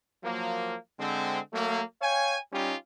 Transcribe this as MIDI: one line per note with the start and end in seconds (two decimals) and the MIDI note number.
0.24 0.76 53
0.24 0.76 54
0.24 0.76 58
1.00 1.39 50
1.00 1.39 56
1.00 1.39 60
1.54 1.83 54
1.54 1.83 57
1.54 1.83 58
2.02 2.37 73
2.02 2.37 77
2.02 2.37 79
2.02 2.37 80
2.53 2.76 55
2.53 2.76 61
2.53 2.76 63
2.53 2.76 65
2.53 2.76 67